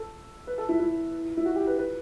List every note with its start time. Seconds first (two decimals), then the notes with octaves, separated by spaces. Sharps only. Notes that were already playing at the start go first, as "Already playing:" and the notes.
Already playing: A4
0.47 B4
0.58 A4
0.69 E4
0.79 E4
1.37 E4
1.45 F#4
1.56 G4
1.67 B4
1.78 B4